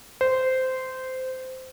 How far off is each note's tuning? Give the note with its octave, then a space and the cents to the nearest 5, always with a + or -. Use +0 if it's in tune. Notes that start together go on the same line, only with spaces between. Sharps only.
C5 -15